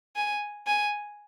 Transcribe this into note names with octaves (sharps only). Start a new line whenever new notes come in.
G#5
G#5